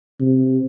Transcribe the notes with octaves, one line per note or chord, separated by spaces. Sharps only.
C3